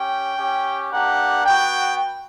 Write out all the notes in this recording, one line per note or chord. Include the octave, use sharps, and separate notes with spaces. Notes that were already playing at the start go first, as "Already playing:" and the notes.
Already playing: C#4 G4 G5
C#4 G4
A#3 D4 G4 F#5
B3 F#4 G5